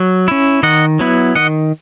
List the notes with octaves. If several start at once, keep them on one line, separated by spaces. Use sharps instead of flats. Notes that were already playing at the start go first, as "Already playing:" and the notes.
Already playing: F#3
C#4 E4
D#3 D#5 F#5
F#3 B3 E4
D#3 D#5 F#5